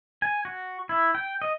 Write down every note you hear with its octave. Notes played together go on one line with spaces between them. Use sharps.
G#5
F#4
E4
G5
D#5